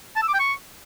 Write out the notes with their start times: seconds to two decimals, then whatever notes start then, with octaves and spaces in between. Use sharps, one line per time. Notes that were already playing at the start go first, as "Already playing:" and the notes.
0.16 A5
0.22 E6
0.28 D6
0.34 G5
0.40 C#6